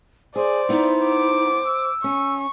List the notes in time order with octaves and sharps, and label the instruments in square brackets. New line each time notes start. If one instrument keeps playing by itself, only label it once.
[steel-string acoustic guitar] G#4 [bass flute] C5 [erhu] D5
[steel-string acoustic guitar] B3 E4 [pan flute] D#4
[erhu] D6
[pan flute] E6
[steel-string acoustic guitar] C#4 [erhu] C#6